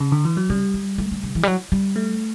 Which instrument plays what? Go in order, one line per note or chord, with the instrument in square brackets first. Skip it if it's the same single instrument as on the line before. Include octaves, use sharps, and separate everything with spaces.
[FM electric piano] C#3
D3
E3
F#3
[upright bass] C#3 [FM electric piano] G3
[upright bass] G3
A3
D3
C#3
E3
G3
F#3
G3
[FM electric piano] A3